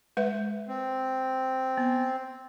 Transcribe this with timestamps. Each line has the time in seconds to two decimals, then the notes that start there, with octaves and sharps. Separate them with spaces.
0.17 G#3 B4 E5
0.68 C4
1.77 B3